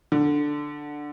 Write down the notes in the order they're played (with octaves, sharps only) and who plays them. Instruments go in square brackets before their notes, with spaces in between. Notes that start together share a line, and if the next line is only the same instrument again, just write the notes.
[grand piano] D3